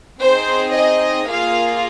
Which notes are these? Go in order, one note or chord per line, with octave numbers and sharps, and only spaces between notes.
C4 D#4 G#4 C5
D#5
A#3 F4 G#4 F5